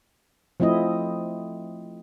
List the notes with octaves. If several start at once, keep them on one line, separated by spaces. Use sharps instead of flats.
F3 A3 C4 E4 D#5